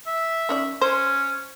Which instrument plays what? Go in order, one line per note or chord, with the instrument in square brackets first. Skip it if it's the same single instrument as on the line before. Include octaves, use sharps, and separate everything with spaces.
[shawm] E5
[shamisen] D#3 C#4 D5
[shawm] C#4 [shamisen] C5